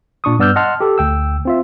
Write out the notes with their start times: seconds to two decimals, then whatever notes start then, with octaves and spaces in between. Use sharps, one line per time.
0.24 A#2 D4 C#6 D#6
0.39 G2 B3 D5 E6 F6 G6
0.56 D#5 F#5 A5 C6 F6
0.81 G4 A4
0.98 D2 G5 E6
1.45 C4 F4 E5